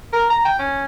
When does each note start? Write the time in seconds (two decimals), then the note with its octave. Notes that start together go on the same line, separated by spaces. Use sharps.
0.13 A#4
0.30 A#5
0.45 G5
0.59 C#4